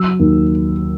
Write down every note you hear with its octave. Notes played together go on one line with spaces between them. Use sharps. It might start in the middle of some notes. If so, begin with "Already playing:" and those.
Already playing: F#3 E6
D#2